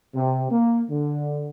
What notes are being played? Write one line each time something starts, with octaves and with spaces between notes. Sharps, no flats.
C3
A#3
D3